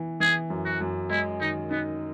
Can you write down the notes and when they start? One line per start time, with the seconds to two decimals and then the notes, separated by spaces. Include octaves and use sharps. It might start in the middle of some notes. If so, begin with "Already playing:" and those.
Already playing: E3 B3
0.20 E3 G#4
0.50 F#2
0.65 F#4
0.81 F#2
1.10 G#3 E4
1.41 D#3 D#4
1.71 B3 D#4